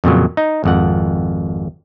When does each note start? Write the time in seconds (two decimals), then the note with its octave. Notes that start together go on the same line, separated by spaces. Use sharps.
0.04 F2 A#2 C#3 F#3
0.37 D#4
0.64 G#1 F2 F#5